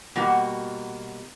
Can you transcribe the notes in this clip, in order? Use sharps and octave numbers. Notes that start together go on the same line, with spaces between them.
B2 G3 A#3 F#4